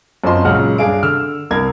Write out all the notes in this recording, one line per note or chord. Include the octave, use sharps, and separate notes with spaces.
F#2 C4 F4 D#5 A5 C6
C#2 A#2 C#3 F#3 F#5 F6
G2 D4 G#4 F5 D7
D3 E6 F6
C2 A#4 A#5 G#6